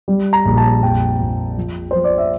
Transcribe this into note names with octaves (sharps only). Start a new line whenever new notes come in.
G3
A#5
A#1
A5
F2 G5
F2
F3
F3 C5
D5
E5